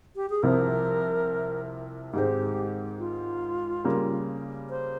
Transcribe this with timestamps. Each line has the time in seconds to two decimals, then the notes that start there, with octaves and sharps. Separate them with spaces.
0.16 G4
0.30 G#4
0.43 C2 C3 F3 A#4
2.13 G#2 D#3 G#3 C4 G4
2.99 F4
3.84 C#3 G3 A#3
4.70 C5